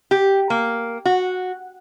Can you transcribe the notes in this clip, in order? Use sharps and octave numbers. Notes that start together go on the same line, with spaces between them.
G4
A#3
F#4